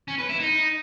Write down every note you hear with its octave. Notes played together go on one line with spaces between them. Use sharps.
C#4
B4
E4
D#4